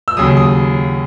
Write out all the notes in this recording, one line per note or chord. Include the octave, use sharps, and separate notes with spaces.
E6
D#2 C#3 F#3 D#6
D#6